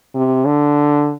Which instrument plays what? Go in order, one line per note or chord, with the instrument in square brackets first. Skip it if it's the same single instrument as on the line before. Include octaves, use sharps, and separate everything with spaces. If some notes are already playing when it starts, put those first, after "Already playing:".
[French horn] C3
D3